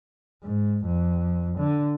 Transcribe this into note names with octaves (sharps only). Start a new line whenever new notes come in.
G#2
F2
D3